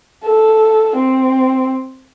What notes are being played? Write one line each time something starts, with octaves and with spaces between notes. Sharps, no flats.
A4
C4